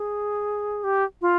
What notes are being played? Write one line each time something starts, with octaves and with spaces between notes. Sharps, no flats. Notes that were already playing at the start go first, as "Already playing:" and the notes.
Already playing: G#4
G4
F4